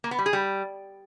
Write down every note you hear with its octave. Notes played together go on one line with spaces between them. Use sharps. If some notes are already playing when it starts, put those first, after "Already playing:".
A#3
B3
G3
G#4
G3